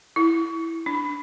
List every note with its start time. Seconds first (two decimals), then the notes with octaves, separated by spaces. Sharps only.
0.16 E4
0.86 D4